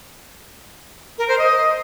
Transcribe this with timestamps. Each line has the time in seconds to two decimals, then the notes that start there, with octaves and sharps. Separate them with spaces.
1.18 A#4
1.28 C5
1.39 D#5